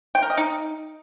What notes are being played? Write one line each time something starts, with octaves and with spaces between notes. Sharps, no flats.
G5
A#4
D#5
D#4